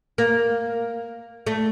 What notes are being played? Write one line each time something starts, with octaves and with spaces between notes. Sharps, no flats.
A#3
A3